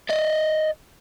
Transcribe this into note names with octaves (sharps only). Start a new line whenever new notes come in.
D5 D#5